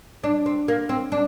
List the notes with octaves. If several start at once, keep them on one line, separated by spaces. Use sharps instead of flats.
D4
C4
A#3
C4
D4